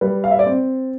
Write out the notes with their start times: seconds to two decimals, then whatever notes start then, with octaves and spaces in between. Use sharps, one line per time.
0.01 G3 B4
0.24 F5
0.31 E5
0.39 D5
0.46 C4 C5